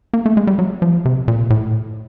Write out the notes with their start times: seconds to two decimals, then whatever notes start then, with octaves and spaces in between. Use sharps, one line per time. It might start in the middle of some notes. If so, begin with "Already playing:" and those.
0.13 A#3
0.26 A3
0.37 G#3
0.47 G3
0.59 F#3
0.82 F3
1.05 C3
1.28 A#2
1.50 A2